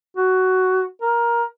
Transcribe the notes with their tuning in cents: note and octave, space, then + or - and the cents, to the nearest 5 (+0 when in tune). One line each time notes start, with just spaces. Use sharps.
F#4 +10
A#4 +15